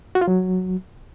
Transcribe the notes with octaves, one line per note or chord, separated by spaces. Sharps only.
F#4
F4
F#3